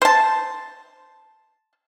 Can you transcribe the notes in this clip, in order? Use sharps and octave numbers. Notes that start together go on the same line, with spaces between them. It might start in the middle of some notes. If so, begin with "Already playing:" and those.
C5 A5